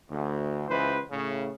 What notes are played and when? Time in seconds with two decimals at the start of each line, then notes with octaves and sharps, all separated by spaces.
0.10 D2
0.69 C#2 E3 B4 C5
1.11 A2 C#3